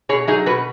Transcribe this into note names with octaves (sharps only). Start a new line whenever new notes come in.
B2 G#4 C#5
F#3 D#4 G#4
B2 F#4 B4